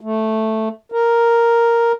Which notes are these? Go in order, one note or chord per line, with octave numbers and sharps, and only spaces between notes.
A3
A#4